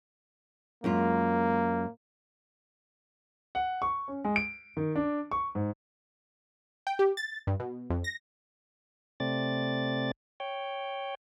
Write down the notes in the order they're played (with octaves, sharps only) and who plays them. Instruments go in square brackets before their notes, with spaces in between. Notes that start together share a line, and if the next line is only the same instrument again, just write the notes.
[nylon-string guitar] F#2 G#3 F4 [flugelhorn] A#3
[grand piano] F#5
C#6
C#4
G#3
D7
D#3
D4
C#6
G#2
[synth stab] G5
G4
A6
G2
B2
F2
A#6
[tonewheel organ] C3 A3 C4 D5 A6
C#5 G5